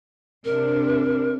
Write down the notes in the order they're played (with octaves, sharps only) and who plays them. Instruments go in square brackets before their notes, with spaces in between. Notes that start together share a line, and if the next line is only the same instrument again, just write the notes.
[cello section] C3 D4 [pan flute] A#4